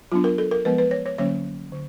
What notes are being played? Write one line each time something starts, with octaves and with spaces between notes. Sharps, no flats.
F#3 B3 D4 F4
A#4
A4
A#4
F3 G#3 B3 B4
B4
C#5
C#5
D3 F#3 A#3 C#4 C#5
D3